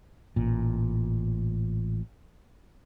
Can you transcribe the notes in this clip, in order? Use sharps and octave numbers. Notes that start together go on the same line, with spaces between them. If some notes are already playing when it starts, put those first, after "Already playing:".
A1 A#2